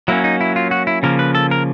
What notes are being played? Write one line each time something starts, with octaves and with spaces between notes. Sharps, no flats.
F#3 A#3 C#4 E4
D#4
E4
F4
F#4
E4
C#3 F3 A#3 A#4
B4
A4
A#4